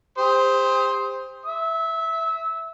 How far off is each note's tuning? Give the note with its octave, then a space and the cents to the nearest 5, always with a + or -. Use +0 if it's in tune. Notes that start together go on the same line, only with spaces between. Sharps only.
G4 +35 C5 +0 D#6 +30
E5 +0 E6 -25